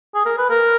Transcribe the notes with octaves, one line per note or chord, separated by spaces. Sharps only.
G#4
A#4
B4
A#4